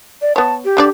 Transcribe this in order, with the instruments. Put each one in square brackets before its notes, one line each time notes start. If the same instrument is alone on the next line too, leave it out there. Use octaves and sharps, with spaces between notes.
[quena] D5
[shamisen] B3 C#5 [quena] A5
[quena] G4
[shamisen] D3 D4 D5